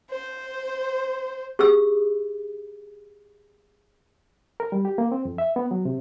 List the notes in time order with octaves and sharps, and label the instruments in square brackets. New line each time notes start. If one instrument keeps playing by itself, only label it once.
[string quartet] C5
[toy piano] G4 G#4 E6
[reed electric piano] A#4
G3
G4
A#3
C4
F2
E5
B3
F#3
C3